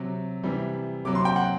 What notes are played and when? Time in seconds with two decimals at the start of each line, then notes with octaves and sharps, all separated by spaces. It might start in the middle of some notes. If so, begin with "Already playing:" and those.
Already playing: C3 F#3
0.43 C3 E3 G3
1.05 C3 F#3 D6
1.15 C6
1.25 G5
1.36 F#5